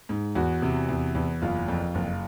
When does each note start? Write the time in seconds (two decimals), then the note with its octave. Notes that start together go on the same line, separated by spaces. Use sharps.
0.09 G#2
0.35 E2 F#4
0.62 C3
0.89 E2
1.15 E2
1.42 F#1 F4
1.68 F2
1.95 F#1